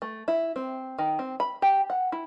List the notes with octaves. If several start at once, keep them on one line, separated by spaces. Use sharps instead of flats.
A3
E4
C4
D#3
C4
B5
G4
F#5
E4